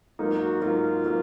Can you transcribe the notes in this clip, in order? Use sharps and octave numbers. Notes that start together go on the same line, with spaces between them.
G#2 F#3 A#3 D#4 F4
F#4
G#2 F#3 A#3 D#4 F4
F4
F#3 A#3